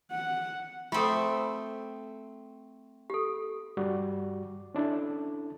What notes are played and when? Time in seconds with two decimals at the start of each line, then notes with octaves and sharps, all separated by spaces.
0.11 F#5
0.92 A3 C4 F4 A4
3.10 G4 A4
3.77 G2 G3 F#4 D5
4.75 C#4 D4 E4 A4